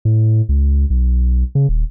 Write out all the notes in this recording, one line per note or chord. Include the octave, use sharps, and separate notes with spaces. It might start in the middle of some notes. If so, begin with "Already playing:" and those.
A2
C#2
B1
C#3
D#1